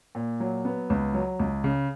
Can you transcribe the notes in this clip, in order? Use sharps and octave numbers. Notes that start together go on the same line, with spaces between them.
A#2
F#3
B3
C#2
F#3
C#2
C#3